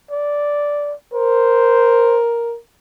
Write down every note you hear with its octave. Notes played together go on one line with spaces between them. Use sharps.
D5
A#4 C5